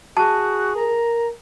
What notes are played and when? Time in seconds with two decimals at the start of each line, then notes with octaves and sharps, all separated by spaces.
0.17 F#4 G#4 A5
0.76 A#4 A#5